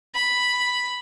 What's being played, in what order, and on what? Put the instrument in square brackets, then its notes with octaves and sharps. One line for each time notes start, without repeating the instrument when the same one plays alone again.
[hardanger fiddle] B5